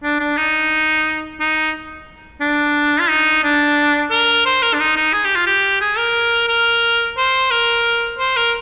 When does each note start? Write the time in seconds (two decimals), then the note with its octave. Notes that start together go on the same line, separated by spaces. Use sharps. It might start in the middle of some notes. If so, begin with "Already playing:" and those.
0.04 D4
0.20 D4
0.37 D#4
1.40 D#4
2.41 D4
3.00 F4
3.10 D#4
3.44 D4
4.11 A#4
4.46 C5
4.63 A#4
4.74 D4
4.80 D#4
4.97 D#4
5.13 G#4
5.25 G4
5.36 F4
5.47 G4
5.81 G#4
5.98 A#4
6.49 A#4
7.18 C5
7.51 A#4
8.19 C5
8.37 A#4